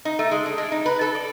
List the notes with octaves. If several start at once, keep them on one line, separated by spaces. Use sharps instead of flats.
D#4
A3
G#3
D4
G#3
D#4
B4
A4
D5